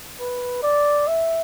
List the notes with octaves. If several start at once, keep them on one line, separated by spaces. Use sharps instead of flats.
B4
D5
E5